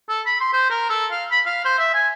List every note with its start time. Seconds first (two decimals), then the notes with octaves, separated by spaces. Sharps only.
0.09 A4
0.26 B5
0.41 C6
0.53 C5
0.70 A#4
0.90 A4
1.12 F5
1.31 B5
1.46 F5
1.65 C5
1.79 E5
1.94 G#5